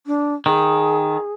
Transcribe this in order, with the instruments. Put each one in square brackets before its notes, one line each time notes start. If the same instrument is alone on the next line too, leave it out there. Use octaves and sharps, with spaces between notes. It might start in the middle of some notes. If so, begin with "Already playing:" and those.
[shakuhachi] D4
[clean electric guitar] D#3 [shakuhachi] G#4